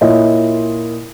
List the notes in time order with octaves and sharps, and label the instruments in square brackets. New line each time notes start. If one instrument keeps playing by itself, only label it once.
[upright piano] A#2 E4 F4 C#5 D#5